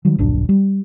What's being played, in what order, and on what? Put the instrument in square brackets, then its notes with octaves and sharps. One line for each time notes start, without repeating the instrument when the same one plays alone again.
[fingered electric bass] D#3 F#3 G3
D1 A#1 F#2 D4
G3